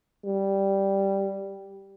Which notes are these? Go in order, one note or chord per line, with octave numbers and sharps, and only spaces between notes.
G3